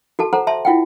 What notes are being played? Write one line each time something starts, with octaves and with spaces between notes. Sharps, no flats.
F#4 A4 A5
A4 C5 F#5 A#5
E5 A5 C6
E4 F4 F#5 G5